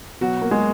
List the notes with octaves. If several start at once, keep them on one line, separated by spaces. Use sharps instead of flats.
B2 F#3 F#4
A#3
G#3 G#4